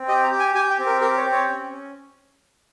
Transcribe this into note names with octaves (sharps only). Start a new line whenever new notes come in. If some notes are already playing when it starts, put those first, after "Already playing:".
Already playing: C4
G4 D#5
A#5
G4
G#5
G4 G#5
G5
C4
A#4
G4 A#4
C#5
C4
C#5
C#4
C#4